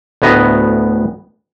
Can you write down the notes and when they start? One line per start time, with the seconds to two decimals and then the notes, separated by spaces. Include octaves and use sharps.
0.22 D2 A2 B3 D#5 A#5